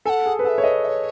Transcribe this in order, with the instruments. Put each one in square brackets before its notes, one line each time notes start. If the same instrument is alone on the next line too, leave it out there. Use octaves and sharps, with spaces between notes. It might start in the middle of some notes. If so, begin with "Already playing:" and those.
[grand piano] A4 [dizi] G#5
[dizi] F#5
[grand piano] G#4
B4
[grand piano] A4 [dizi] E5 F#5
[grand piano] C#5
B4 D#5
[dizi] E5
C#5